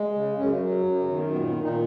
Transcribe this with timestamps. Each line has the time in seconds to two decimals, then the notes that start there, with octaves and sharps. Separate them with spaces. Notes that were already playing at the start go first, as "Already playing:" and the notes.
Already playing: G#3
0.14 C#3
0.37 F#2 C#3 C#4
0.61 F#3
0.85 F#2
1.00 C#3 C#4
1.08 D#3
1.16 B3
1.32 A#2 B3
1.49 B3
1.56 A#2
1.63 D#3 D#4